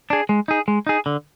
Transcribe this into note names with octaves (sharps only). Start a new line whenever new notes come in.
D4 G#4
G#3
D#4 G#4
G#3
D#4 G#4
D3